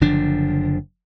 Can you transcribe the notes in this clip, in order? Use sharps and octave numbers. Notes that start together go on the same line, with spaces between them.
F#1 D3 F3 D4